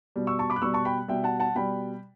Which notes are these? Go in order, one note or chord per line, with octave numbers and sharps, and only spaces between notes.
B2 G3
C#6 E6
A5 C#6
B5 D6
F#6
B2 G3 C#6 E6
A5 C#6
G5 B5
B2 G3 E5 G5
F#5 A5
F#5 A5
B2 G3 G5 B5